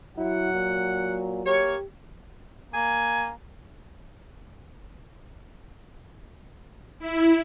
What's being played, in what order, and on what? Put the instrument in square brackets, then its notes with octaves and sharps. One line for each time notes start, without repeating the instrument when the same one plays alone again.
[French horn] F#3 [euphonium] E4 [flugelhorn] F#5
[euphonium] A#2
[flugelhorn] A#3 [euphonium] G4 [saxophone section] C#5
[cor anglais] A#3 [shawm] G#5
[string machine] E4